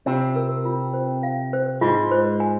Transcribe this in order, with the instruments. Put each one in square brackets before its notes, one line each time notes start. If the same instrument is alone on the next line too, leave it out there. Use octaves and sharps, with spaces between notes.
[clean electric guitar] C3 C4 [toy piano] F4
[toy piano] A#4
F4
C5
F5
C5
[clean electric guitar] G#2 G#3 [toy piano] F4
[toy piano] C5
G#5